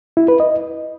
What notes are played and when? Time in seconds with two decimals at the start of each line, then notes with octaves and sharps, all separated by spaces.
0.17 E4
0.28 B4
0.40 D#5